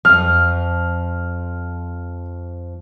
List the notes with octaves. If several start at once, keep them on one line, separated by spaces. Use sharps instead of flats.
F2 F3 F6